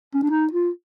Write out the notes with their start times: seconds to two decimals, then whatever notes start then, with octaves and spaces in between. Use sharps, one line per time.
0.14 C#4
0.22 D4
0.30 D#4
0.53 F4